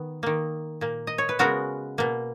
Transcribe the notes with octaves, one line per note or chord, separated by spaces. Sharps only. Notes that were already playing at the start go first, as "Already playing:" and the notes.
Already playing: D#3 B3
D#3 A#3
A#2 A#3
D#5
C#5
B4
C#3 G#3 B3 F#4 A#4
B2 A#3